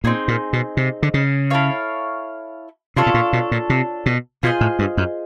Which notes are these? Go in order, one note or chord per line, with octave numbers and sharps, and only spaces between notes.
A#2 C4 D#4 G#4
A#2
B2
C3
D3
C#3
E4 A4 C#5 F5
C3 D4 F4 A4 C#5
B2
A#2
B2
A#2
C3
B2
B2 F4 G#4 C5 D#5
A2
G2
F#2